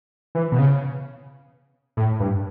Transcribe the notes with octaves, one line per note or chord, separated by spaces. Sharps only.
E3
B2
C#3
A2
G2